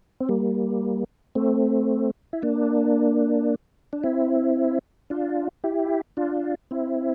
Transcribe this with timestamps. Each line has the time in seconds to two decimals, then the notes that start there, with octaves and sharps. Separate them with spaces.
0.21 C4
0.29 G3 A#3
1.35 A3 C4
2.33 E4
2.42 A#3 D4
3.93 D4
4.03 C4 E4
5.10 D4 F4
5.64 E4 G4
6.17 D4 F4
6.71 C4 E4